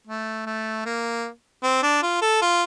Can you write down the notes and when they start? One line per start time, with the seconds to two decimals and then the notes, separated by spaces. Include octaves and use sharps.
0.07 A3
0.46 A3
0.85 A#3
1.63 C4
1.83 D4
2.02 F4
2.22 A4
2.42 F4